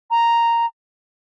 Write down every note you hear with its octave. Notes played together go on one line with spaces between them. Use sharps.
A#5